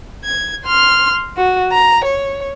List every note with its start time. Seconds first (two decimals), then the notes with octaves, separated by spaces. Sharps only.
0.24 G#6
0.65 C6 F6
1.37 F#4
1.72 A#5
2.04 C#5